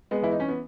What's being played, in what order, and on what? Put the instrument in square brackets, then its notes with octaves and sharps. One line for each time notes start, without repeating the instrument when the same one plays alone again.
[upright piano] G#3 B3
E3 E4
D#4
C#4
B3